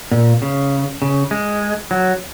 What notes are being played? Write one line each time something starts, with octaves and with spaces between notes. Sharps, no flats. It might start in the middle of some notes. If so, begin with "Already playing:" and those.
A#2
C#3
C#3
G#3
F#3